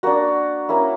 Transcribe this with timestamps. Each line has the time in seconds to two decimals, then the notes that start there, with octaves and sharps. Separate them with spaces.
0.03 A#3 D4 F#4
0.69 A#3 C#4 E4